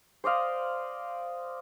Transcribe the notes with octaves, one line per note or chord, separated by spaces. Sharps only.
C5 D5 D#5 F5